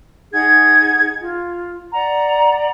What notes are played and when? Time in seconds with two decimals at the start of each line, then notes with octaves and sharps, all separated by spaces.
0.33 D#4 G#4 F#5 G#6
1.21 F4
1.93 D5 F#5 A#5